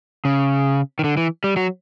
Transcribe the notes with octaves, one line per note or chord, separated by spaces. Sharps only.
C#3
D#3
D3
E3
G3
F#3